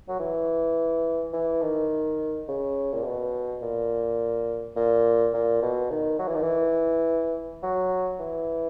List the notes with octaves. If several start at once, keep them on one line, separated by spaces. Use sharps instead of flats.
F#3
E3
E3
D#3
C#3
A#2
B2
A#2
A#2
A#2
B2
D#3
F#3
E3
D#3
E3
F#3
E3